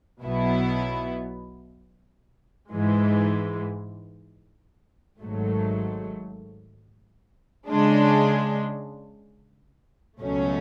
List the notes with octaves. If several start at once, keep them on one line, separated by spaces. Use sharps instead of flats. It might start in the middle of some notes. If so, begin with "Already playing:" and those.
B1 B2 F#3 B3 E4
G#2 E3 G#3
G#1 G#2 F#3 A3
C#3 G#3 D4
C#2 B2 F#3 A3 C#4